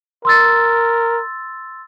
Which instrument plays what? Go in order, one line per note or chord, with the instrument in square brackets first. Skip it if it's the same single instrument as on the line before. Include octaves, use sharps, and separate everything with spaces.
[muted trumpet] A#4 [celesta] C6 E6 A6